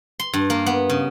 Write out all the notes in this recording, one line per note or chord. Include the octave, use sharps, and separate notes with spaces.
C6
G2
A#3
B3
C#3